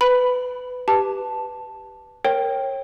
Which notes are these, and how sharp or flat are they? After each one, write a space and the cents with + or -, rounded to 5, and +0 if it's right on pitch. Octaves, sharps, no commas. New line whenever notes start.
B4 +20 B5 +0
G4 +0 B4 +0 A5 +0
A#4 +0 C#5 -35 G5 +0